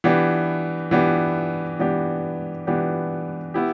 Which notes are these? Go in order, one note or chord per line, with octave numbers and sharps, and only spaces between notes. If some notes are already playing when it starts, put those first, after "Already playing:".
E3 B3 D4 G4
E3 B3 D4 G4
E3 B3 D4 G4
E3 B3 D4 G4
B3 E4 G4